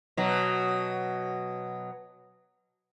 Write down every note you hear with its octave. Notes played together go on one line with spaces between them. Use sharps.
B2 F#3